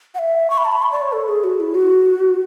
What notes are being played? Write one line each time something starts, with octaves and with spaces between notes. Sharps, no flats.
F#5
E5
C#6
B5
A5
B5
C#6
D5
C#5
A4
G#4
F#4
E4
F#4